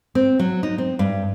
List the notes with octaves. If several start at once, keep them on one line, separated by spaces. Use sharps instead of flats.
C4
F#3
D#4
C4
G2